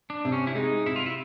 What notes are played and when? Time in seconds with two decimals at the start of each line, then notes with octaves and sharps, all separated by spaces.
0.10 D4
0.25 C3
0.32 C#4
0.47 E4
0.55 G#3 D#4
0.86 C3 E4
0.96 F4
1.06 E4